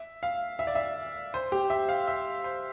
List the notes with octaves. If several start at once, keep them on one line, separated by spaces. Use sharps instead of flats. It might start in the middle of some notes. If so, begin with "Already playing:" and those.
Already playing: E5
F5
E5
D5
E5
C5
G4
E5
F5
E5
C5